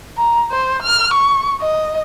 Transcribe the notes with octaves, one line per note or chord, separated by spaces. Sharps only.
A#5
C5
F6
C#6
D#5